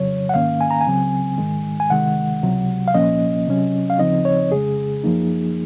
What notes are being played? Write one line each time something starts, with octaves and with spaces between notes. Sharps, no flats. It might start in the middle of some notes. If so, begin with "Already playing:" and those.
Already playing: F2 C#3 F#3 C#5
F#5
G#2 D#3 A#3 C#4 F5
G#5
A#5
G#5
C#2 C#3 F#3 C4
G#2 D#3 G#3
G#5
C#2 C3 D#3 G#3 F#5
C#2 C3 F#3
F5
C2 A#2 F3 A#3 C#4 D#5
C3 F#3 C#4
F5
D#2 C#3 F3 C4 D#4 D#5
C#5
F2 C#3 G#3 G#4
F#2 F3 A#3 D#4